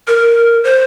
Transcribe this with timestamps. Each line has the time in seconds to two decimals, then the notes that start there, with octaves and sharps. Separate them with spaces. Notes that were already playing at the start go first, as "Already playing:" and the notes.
0.08 A#4
0.64 C5